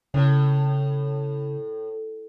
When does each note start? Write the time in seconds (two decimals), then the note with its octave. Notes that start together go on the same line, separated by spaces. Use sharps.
0.14 A2 C#3